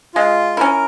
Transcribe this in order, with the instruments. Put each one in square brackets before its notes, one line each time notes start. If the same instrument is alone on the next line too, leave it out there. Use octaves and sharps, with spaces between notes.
[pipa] G#3 [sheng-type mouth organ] F4
[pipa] C#4 E4 [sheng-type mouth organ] A#4